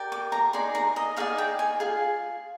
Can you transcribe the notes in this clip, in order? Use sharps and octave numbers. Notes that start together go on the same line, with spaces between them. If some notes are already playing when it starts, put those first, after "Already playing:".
Already playing: G4 A#4 D5
D6
A#5
D#4 G#4 D5 C6
A#5
D#5
D#4 G#4 D5 F5
G5
G#5
F4 G#4